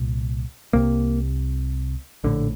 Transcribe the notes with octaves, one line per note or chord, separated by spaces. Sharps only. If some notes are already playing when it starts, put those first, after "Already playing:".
Already playing: C2 A#2
C2 C3 A#3
A#1 A2 D3